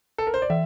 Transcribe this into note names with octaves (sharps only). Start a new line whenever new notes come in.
A4
A#4
C5
D5
E3 E5